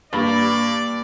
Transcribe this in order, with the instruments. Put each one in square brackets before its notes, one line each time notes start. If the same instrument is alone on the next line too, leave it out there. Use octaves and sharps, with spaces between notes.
[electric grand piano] G2 [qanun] A#3 [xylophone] G4 B5 A6 [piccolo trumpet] D5